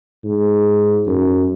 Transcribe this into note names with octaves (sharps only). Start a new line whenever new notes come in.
G#2
F#2